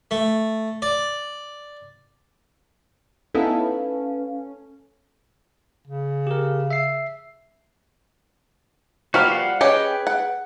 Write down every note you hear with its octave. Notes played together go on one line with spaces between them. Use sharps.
A3
D5
B3 C#4 D#4 E4 A4 B4 F5
C#3
G4 A#4
E5 C7
F3 G3 A#3 F#4 B4 F5
F5 F#5
C#4 G4 G#4 B4 D#5 G5
F#5